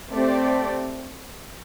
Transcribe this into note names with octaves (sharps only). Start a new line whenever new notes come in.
A3 C4 G4 D5